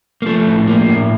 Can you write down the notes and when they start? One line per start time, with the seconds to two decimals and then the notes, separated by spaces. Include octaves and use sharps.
0.22 A#3
0.26 F3 A3
0.47 A2
0.67 F3 A#3
0.88 A2